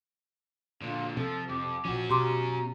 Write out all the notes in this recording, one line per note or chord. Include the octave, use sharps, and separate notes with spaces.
A#2 D3 F4
C3 F3 A4
F2 D6
A#1 F3 C#4 F#4
B2 G4 A#5 C6 D6